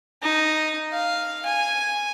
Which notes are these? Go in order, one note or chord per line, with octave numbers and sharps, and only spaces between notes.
D#4
F5
G#5